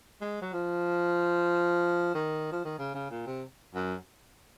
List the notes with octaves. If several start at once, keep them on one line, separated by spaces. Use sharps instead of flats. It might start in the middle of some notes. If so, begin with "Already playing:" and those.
G#3
F#3
F3
D#3
F3
D#3
C#3
C#3
A#2
C3
F#2